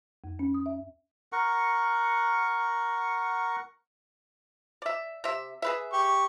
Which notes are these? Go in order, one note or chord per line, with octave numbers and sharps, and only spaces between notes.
F2
C#4
D#6
E5
A#4 F#5 C#6
D5 E5
C3 E5
G#4 B4 E5
G4 C#6